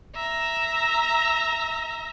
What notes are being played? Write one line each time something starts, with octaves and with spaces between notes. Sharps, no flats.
E5 A#5